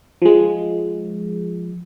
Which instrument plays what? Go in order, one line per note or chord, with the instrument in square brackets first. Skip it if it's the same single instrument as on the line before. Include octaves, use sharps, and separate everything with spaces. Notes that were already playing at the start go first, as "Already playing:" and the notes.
[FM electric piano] F3 G#3